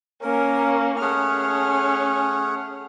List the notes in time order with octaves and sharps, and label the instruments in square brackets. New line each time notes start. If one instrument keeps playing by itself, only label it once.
[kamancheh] A#3 C#4 [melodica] A#4
[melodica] A3 G#4 F#5 [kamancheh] C#4 F6